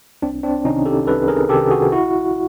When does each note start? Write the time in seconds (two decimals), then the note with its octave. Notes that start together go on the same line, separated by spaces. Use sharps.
0.22 C2 C4 D4
0.43 C4 D4
0.64 C3 D#3 C#4 D#4
0.86 G4 A4
1.07 C2 A4 B4
1.28 G#4 A#4
1.49 C3 G4 A4
1.53 D#3
1.70 F#4 G#4
1.92 A#1 E4 F#4